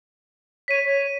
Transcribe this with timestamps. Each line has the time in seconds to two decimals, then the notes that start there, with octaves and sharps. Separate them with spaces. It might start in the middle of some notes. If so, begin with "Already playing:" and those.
0.68 C#5 B6 D#7
0.83 C#5